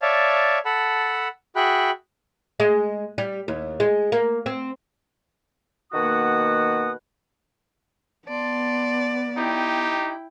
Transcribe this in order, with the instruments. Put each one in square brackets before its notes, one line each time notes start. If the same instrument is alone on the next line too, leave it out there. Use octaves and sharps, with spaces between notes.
[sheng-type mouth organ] C#5 D5 E5 F5 A5
A4 F#5 A5 B5
F#4 G#4 E5 G5 B5 F#6
[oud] G#3
G3
D#2
G#3
A#3
C4
[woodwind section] B2 D#3 A#3 F#4 F#5 D#6
[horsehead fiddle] B3 [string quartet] D5 [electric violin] A5 C6
[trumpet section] D#4 G4 [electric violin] E4 G5